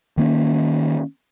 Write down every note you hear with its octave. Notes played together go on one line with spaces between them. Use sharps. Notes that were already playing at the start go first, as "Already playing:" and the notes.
D#3 A#3 C#4